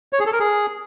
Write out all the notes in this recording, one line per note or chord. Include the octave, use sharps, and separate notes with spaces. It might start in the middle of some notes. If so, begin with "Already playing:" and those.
C#5
G#4
A4
A#4
G#4